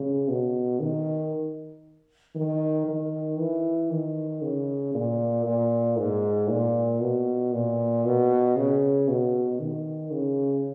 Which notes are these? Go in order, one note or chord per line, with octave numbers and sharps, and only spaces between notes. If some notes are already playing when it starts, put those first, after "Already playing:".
Already playing: C#3
B2
D#3
D#3
D#3
E3
D#3
C#3
A#2
A#2
G#2
A#2
B2
A#2
B2
C#3
B2
D#3
C#3